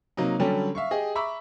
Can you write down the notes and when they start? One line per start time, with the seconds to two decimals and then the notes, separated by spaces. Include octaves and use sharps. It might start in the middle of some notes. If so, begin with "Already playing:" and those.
0.17 C3 F#3 A#3 D#4
0.39 D3 F#3 G3 C#4 G4 A4
0.75 E5 F5 C#6
0.91 G4 G#4 D#5
1.15 E5 A#5 B5 C#6 D6 E6